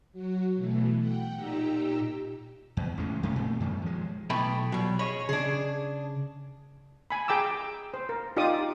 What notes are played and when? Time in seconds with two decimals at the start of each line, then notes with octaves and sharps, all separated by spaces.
0.13 F#3 F#4
0.55 B2 E3 A3
0.97 F#5 G5
1.35 A#2 D#4 G4 A#5 E6
2.77 E2
2.98 A1 C#3 G#3
3.23 F#2 C3 F3 A3
3.36 A#2 A3 C4
3.60 F#2 D#3 G3
3.82 F3 G#3
4.30 B1 E3 A3 B3 G5 B5
4.72 B1 B2 F#3 G3
4.99 G#4 C#5 D#5 B5
5.29 C#3 D4 G#4
7.10 G#5 B5
7.28 G#4 G5 A#5 D6 E6
7.94 C5
8.09 A#4
8.37 D#4 F4 G4 D5 D6 D#6